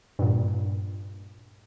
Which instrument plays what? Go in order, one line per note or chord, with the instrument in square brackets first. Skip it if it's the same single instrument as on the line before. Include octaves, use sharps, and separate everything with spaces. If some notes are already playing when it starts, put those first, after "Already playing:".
[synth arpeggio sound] G2 A#2